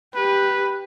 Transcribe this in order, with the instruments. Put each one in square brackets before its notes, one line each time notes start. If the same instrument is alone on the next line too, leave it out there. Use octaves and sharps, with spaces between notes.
[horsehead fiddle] G4 [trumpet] B4